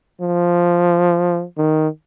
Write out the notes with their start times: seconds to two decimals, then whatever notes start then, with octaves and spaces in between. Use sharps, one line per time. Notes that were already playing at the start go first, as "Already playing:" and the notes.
0.21 F3
1.58 D#3